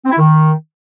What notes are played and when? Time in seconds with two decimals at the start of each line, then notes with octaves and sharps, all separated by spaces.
0.05 C4
0.12 E4
0.18 D#3